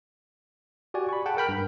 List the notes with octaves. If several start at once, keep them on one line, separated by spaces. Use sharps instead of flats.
F#4 G4 D5 G#5
B5 C#6
G#4 F#5 G5 A5
A#4 G5 B5 F6
G2